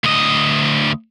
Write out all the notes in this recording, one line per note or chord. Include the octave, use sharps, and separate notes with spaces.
D2 D#5